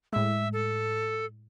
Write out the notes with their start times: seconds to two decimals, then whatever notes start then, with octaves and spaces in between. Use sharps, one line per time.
0.13 A2 G#3 E5
0.53 A4